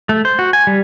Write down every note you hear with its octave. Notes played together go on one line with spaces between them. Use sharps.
A3
C5
F#4
G#5
G3